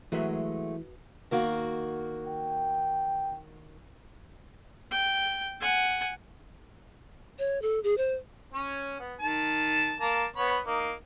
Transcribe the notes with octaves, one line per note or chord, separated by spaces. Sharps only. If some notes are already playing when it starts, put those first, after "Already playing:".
E3 F#3 G#3 A3 F#4 B4 E5
D#3 A#3 F#4
G5
G5
F#5 G#5
C#5
A4
G#4
C5
C#4 C#5
B3
D#3 A5
A#3 A5 A#5
B3 C#5 B5
A#3 D#4